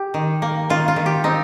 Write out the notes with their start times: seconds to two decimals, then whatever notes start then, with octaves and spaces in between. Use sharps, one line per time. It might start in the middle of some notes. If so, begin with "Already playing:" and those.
Already playing: G4
0.14 D#3
0.42 A#3
0.70 D#3 F4
0.88 F4
0.96 D#3
1.06 G4
1.24 C4 D#4